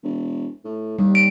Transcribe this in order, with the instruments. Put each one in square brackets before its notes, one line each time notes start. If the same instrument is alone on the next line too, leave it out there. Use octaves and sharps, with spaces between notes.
[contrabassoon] E1
A2
[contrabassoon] D#2 [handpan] G3
[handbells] D7